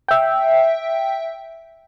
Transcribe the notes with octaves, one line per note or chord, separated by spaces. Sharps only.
E5 G5